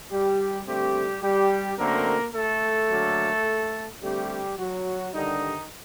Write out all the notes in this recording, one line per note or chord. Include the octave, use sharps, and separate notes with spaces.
G3 G4
D3 G3 A3 C4 G4
G3 G4
F#2 D3 A3 A#3 C4 A#4
A3 A4
D3 F#3 A#3
D3 G3 A3 C4 G4
F#3 F#4
G2 D3 D#3 G3 D#4